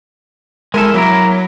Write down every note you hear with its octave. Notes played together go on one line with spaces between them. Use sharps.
G#3 E4 A4 A#4
F#3 A#3 E4 A#4